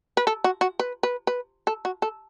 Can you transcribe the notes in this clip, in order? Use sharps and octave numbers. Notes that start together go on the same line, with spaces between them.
B4
A4
F#4
F#4
B4
B4
B4
A4
F#4
A4